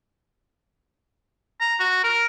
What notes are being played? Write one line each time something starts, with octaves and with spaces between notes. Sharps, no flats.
A#5
F#4
A#4